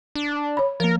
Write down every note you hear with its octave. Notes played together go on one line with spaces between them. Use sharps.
D4
C#5 B5
F3 A#3 A#4